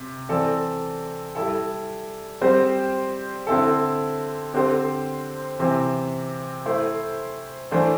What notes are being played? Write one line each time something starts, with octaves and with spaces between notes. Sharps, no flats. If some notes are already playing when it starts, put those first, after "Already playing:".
Already playing: C3
E3 C4 A4 D5
G3 E4 A4
G3 C4 G4 C5
D3 C4 E4 A4
D3 C4 G4 C5
C3 E3 C4
A3 E4 C5
E3 A3 D4 C5